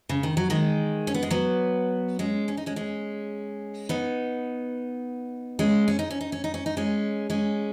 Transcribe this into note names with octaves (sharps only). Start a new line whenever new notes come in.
C#3
D#3
F#3
D#3 G#3
C#4
B3
G#3
F#3 B3
G#3 C#4
C#4
D#4
G#3 C#4
G#3 C#4
B3 D#4
G#3 C#4
C#4
D#4
C#4
D#4
C#4
D#4
C#4
D#4
G#3 C#4
G#3 C#4